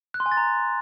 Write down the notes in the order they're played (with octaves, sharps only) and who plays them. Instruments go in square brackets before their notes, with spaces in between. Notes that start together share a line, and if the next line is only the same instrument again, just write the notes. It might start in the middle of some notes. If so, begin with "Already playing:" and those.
[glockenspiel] F#6
C6
G#5
A6
A#5